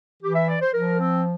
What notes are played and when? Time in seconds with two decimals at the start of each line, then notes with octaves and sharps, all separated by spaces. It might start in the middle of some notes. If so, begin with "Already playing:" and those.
0.22 E3 G4
0.35 E5
0.48 D5
0.61 C5
0.74 F3 A#4
0.99 C4